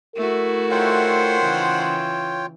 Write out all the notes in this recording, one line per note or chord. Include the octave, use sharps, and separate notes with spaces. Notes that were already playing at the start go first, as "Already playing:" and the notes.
A3 E4 F#4 A#4
D#3 F4 C5 C#5 F#5 G5
C#3 E3